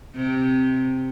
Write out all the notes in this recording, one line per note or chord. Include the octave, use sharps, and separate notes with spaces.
C3